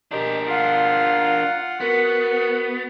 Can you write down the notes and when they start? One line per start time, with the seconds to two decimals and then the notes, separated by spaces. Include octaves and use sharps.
0.11 D4 G4 A#4 D#5
0.49 F4 F5 F#5
1.81 B3 F#4 A#4